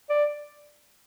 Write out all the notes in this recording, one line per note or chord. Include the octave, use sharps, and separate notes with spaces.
D5